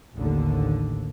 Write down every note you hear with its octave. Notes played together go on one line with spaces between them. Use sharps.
A1 D#2 D3